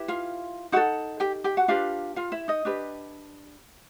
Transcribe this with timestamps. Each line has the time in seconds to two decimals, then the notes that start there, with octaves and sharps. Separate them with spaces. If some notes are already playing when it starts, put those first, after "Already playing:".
Already playing: E4 G4 B4
0.08 F4 F5
0.72 D#4 F#4 F#5
0.76 A4
1.20 G4 G5
1.44 G4 G5
1.57 F#4 F#5
1.68 D4 F4 G4 B4 F5
2.16 F4 F5
2.32 E4 E5
2.48 D#4 D#5
2.65 D4 G4 B4